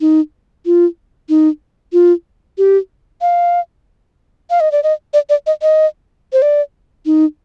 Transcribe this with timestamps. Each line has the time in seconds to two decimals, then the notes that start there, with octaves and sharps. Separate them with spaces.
0.01 D#4
0.66 F4
1.29 D#4
1.93 F4
2.58 G4
3.21 F5
4.50 F5
4.60 D#5
4.72 D5
4.83 D#5
5.14 D5
5.29 D5
5.47 D#5
5.62 D#5
6.33 C5
6.42 D5
7.06 D#4